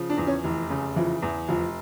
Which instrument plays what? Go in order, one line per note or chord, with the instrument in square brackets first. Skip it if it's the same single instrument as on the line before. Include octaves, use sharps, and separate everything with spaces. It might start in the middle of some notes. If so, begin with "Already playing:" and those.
Already playing: [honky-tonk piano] C#3 F3
[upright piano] D4
[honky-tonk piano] E2
[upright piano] C#4
[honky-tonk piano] F1 [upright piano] E3
[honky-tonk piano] C#3
[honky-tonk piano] E3 [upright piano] F3
[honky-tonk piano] E2
[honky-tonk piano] F1 [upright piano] F3